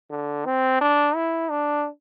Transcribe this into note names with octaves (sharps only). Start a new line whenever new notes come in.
D3
C4
D4
E4
D4